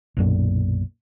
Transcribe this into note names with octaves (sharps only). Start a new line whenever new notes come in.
B1 F#2 A#2